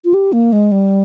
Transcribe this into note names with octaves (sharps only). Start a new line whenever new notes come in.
F4
G4
A#3
G#3
G3